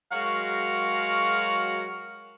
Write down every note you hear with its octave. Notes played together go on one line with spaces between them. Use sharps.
F#3 G#3 F#4 A#4 F5